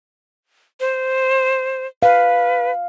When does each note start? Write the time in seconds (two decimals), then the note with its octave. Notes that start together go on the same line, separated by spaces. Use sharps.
0.80 C5
2.03 B4 F5